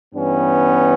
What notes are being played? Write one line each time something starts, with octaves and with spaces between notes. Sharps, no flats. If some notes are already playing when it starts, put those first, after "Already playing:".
G2 E3 B3 C#4